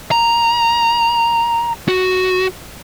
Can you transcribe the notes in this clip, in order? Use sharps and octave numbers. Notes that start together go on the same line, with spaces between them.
A#5
F#4